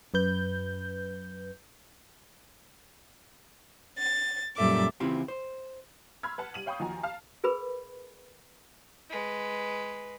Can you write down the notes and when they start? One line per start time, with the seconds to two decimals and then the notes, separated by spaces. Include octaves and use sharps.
0.14 F#2 B4 G6
3.98 A6
4.56 F#2 A#2 G3 A4 E5 D6
5.00 C#3 E3 C4 E4 F4 G4
5.28 C5
6.23 B5 C6 E6 F6 G#6
6.38 B4 F#5 A5
6.54 G3 D#7 F#7
6.66 C#5 F5 G5 B5 C#6 D#6
6.79 D#2 D#3 F3 F#4 G#5 A#5
7.03 F5 A5 F6
7.44 G#4 A#4 B4 B5
9.10 G#3 B4